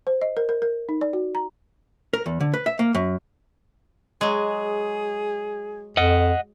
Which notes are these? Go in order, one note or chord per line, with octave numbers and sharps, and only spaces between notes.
C5
D#5
A#4
A#4
A#4
D#4
D5
F#4
A#5
A#4
E2
D3
B4
E5
A#3
F#2
F#3 G#3 G#4
F2 D#5 F#5